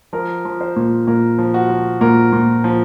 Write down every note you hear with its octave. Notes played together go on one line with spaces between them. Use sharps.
F3 A#4
F3
C5
A#2
A#2 A#4
F3
F#4
F3
A#2 A#4
A#2
F3